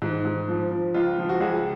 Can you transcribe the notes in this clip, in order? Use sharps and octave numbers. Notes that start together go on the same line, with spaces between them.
G#2
G#2
F3
F3
C#2 F4
F3
F#4
C#2 G#4